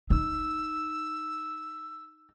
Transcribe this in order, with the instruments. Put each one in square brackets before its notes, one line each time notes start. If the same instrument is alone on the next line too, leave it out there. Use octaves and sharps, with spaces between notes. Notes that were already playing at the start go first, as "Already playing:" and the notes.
[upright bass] D#4 [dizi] E6